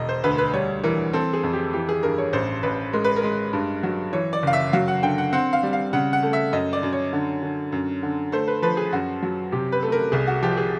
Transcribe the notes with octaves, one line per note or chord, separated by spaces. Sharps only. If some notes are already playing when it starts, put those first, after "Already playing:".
Already playing: E1 D#5
C5
D2 B4
B4
G3 C#5
E3 A#4
C4 A4
G#4
F2
G4
E3 G4
G#4
G2 A#4
C#5
A1 C5
A1 B4
G#3 A#4
B4
A#4
G#3
G2
F#3
E3 C#5
D5
F#1 F5
E5
F#3 F5
F#5
D3 G5
F#5
C4 F#5
F5
G3
F5
C#3 F#5
F#5
A3
E5
F#2 D#5
D5
F#2
C#5
D3
D3
F#2
D3
A3 C5
B4
F3 B4
G#4
F#2 F#4
F#3
C3 G4
B4
A3
A#4
C2 G#4
F#4
F3 G4
G#4